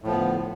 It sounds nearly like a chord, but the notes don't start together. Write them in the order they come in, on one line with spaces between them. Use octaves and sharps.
A2 F3 B3 D3